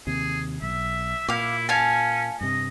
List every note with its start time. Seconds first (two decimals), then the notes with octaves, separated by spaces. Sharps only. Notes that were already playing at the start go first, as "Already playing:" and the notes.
0.07 D#2 C3 G#4
0.62 B1 E5
1.29 A#2 E4 F5 D6
1.69 C#4 F5 G#5 A5
2.41 G2 C3 D#5